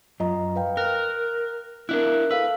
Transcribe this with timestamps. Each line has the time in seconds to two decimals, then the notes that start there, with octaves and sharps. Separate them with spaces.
0.20 F#2 F4 D#5 A#5
0.56 B4 F5 G5
0.77 A#4 F6 F#6
1.89 D4 E4 A#4 E5 F#6
2.31 A4 B4 F5 E6